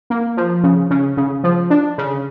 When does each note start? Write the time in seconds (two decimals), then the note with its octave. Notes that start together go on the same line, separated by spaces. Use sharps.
0.10 A#3
0.37 F3
0.63 C#3
0.91 C#3
1.17 C#3
1.44 F3
1.70 D4
1.98 C#3